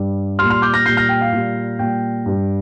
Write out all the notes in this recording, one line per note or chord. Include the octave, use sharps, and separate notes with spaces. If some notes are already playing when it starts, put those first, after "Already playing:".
Already playing: G2 G3
A#2 G3 C6 F6
C6 F6
D6 G6
F6 A#6
A#2 G3 G6 C7
F6 A#6
G5
F5
A#2 G3
A#2 G3 G5
G2 G3